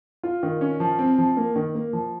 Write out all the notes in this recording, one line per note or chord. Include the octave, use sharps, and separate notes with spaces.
F4
D#3
C#4
F3
C4
F3
A#3
D#3
A#3
F3